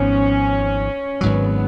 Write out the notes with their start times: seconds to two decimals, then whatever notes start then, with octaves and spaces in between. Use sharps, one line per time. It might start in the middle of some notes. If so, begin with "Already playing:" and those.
Already playing: G#1 G#2 F3 B3 C#4
1.21 G#1 G#2 F#3 B3